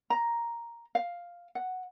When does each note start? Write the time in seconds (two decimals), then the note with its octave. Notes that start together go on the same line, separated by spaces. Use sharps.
0.10 A#5
0.95 F5
1.55 F#5